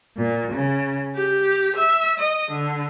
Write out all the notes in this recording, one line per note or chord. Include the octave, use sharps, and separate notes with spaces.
A#2
C#3
G4
E5
D#5
D3